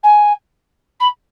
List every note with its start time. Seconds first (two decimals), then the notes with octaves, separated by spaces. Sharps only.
0.03 G#5
1.00 B5